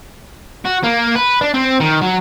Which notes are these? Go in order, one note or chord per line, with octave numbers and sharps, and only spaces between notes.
F#4
A#3
B4
D4
C4
D#3
F#3